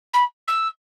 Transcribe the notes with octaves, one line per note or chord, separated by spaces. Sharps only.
B5
E6